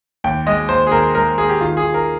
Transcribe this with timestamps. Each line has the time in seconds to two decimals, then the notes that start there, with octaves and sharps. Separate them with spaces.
0.24 D#2 G5
0.46 G#3 D#5
0.69 D#2 C5
0.87 G#4
0.92 D#2 A#4
1.15 G#3 A#4
1.38 D#2 G#4
1.49 G4
1.61 D#3 F4
1.77 G#4
1.83 D#3
1.94 A#4